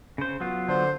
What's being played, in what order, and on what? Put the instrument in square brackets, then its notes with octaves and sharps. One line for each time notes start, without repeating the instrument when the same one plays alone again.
[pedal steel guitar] C#3 C5
F#3 B3 F4
[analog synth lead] D3 [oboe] C5